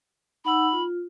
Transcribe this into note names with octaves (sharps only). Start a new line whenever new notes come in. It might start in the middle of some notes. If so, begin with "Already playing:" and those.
D#4 F#5 B5 E6
F4